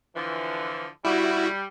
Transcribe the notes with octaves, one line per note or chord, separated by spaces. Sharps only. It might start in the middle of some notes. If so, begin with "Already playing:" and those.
D3 E3 F3
G3 E4 F#4